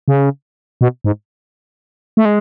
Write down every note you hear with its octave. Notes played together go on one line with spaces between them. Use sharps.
C#3
B2
G#2
A3
G#3